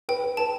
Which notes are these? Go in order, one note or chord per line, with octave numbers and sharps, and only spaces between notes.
B4 G5
B4
B4 A5